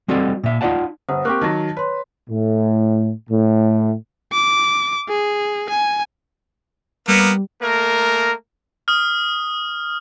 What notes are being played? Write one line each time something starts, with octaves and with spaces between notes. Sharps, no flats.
G3 C4 F#4 A4 D5 D#5
A#2 E5
D#4 F4 G4 D5 F#5 A5
G1 C5 F#5 D#6
A#3 C4 G4 C#6 D6 F#6
D#3 F#3 A5
B4 C#5 C6
A2
A2
D6
G#4
G#5
G3 A#3 B3
A3 A#3 A#4
D#6 F6